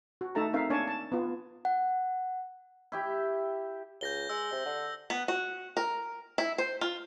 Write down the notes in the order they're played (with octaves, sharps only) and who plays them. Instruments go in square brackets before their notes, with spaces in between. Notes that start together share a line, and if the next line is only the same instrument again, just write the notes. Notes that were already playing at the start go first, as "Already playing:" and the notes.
[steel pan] F#4
A3 D#4 A4 E5 A5 A#5
C4 D#4 A#4 E5 F5
A#3 D4 C#5 D5 G#5 A5
A5
B3 F4
[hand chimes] F#5
[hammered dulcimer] E4 G4 E5
[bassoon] C#2 [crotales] G6 A#6 G7
[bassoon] G#3 [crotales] E6
[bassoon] C3
D3
[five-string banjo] B3
F#4
A#4
E4
C5
F4